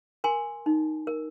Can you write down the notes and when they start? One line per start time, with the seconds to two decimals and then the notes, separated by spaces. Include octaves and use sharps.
0.24 A#4 G#5 C6
0.66 D#4
1.07 A#4